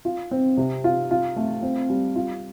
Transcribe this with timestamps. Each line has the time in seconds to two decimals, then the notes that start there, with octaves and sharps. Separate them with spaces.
0.05 F4
0.31 C4
0.57 C3
0.84 F4
1.11 F4
1.36 A3
1.62 C4
1.90 G3
2.16 F4